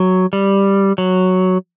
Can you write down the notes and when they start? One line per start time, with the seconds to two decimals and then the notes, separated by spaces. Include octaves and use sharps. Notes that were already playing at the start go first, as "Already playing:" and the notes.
Already playing: F#3
0.33 G3
0.98 F#3